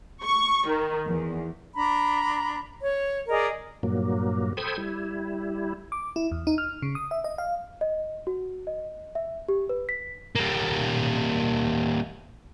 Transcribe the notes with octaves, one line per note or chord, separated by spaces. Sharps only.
C#6
D#3
E2
D4 A#5 B5
C#5
G#4 A#4 D5 D#5
G2 A#2 F#3 A#3
A4 C5 G5 B5 D#6 G#6
G3 E4
D6
E4
E2
D#4
F6
C#3
D#6
E5
D#5
F5
D#5
F#4
D#5
E5
G4
B4
B6
G3 A#3